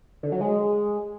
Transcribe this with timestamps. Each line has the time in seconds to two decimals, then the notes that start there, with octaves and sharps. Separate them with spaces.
0.23 D3
0.32 F#3
0.41 G#3